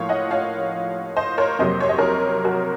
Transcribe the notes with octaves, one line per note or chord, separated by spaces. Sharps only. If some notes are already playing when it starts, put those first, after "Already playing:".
Already playing: A2 F3 A#3 C#5 F5
D#5 F#5
C#5 F5
C5 D#5
A#4 C#5
F2 C3 F#3 A#3 C5 D#5
C#5
D#5
A#4 C#5
F#4 A#4